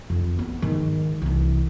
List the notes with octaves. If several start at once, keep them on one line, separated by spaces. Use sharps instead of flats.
F2
B3
G#2 D#3
C2 E3